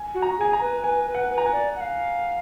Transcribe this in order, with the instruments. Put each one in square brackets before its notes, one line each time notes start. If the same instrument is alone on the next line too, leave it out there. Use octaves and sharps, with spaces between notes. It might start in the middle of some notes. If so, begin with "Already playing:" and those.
Already playing: [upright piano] G#5
[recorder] F#4
[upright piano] A#5
[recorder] G#4 [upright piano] G#5
[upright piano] A#5
[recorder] B4
[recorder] B4 [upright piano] G#5
[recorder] B4
[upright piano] F#5
[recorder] B4
[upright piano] A#5
G#5
[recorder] D5
F#5
F5